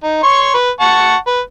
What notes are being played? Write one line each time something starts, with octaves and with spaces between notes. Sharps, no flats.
D#4
C#5 C6 C#6
B4
F#5 A5 C#6
B4